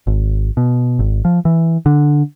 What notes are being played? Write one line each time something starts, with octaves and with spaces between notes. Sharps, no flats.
G#1
B2
G#1
F3
E3
D3